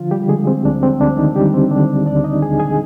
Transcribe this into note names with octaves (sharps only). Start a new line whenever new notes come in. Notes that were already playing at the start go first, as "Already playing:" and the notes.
Already playing: D3 F3 F4
G3 G4
D3 G#3 G#4
C4
D2 D4
C4
D2 D4
D#3 D#4
D3 G3 G4
C4
D3 D4
D2 D4 D5
D#4 D#5
D2 G#4 G#5
G#4 G#5